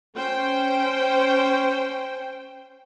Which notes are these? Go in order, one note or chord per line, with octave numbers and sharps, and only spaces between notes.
C#4 C5 G5